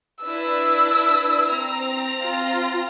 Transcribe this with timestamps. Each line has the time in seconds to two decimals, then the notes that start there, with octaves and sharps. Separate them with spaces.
0.24 D4 E4 B4 E6
1.51 C4 A#5
2.23 F4